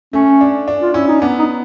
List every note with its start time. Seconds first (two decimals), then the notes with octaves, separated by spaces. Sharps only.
0.13 A3 C#4
0.41 D4
0.68 D4
0.81 F4
0.94 C#4 E4
1.07 D#4
1.21 B3 D4
1.39 D#4